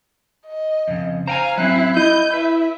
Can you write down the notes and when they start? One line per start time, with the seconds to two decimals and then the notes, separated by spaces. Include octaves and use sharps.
0.46 D#5
0.88 F2 C#3
1.27 C5 F5 G5 G#5 A#5
1.58 F#3 C4 C#4 E4 F#6
1.97 E4 D#5 G6
2.34 B4 E5